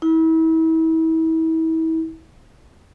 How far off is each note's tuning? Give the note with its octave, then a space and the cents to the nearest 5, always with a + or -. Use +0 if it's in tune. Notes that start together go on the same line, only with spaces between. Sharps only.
E4 -35